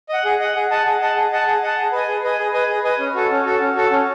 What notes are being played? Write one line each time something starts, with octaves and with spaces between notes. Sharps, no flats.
D#5 F#5
G#4
D#5 F#5
G#4
D#5 F#5 A5
G#4
D#5 F#5 A5
G#4
D#5 F#5 A5
G#4
D#5 F#5 A5
G#4
B4 D#5 G#5
G#4
B4 D#5 G#5
G#4
B4 D#5 G#5
G#4
B4 D#5 G#5
C#4
F#4 A4
C#4
F#4 A4
C#4
F#4 A4
C#4